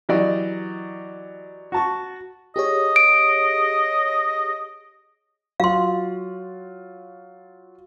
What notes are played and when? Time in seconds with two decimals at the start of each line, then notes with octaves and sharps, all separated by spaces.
0.09 E3 F#3 G4 D5 D#5
1.72 F#4 A5 C#6
2.56 G4 G#4 C#5 D#5
2.96 D7
5.60 F#3 F4 F5 C6